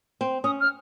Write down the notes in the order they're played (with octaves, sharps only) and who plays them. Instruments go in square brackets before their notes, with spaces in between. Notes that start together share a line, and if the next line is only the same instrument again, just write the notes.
[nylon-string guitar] C4
[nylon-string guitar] C#4 [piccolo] D#6
[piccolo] F6